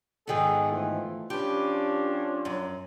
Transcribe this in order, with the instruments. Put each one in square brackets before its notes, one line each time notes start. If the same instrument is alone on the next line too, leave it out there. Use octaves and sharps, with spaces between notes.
[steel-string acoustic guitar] G#2 D#3 B3 [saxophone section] G#4 A4
[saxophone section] E3 F3 A3
[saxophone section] F3 C#4 D4 [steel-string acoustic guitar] G4 B4
[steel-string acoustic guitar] F#2